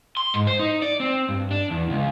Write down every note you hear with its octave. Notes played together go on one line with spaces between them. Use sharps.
C6
G#2
C5
D#4
D5
C4
G2
D4
E2
C#2